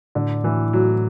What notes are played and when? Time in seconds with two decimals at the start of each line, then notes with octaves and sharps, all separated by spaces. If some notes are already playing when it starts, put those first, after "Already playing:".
0.15 A2 D3
0.44 A2 E3
0.73 A2 F#3